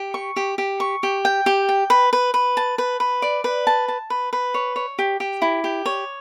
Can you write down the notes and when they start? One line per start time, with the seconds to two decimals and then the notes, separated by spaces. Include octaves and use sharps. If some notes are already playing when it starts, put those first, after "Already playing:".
Already playing: G4
0.14 C#6
0.36 G4
0.58 G4
0.80 C#6
1.03 G4
1.25 G5
1.46 G4
1.69 G5
1.90 B4
2.13 B4
2.34 B4
2.57 A5
2.78 B4
3.00 B4
3.22 D5
3.44 B4
3.67 A5
3.88 A5
4.10 B4
4.33 B4
4.54 C#5
4.76 C#5
4.99 G4
5.20 G4
5.42 E4
5.64 G4
5.86 C#5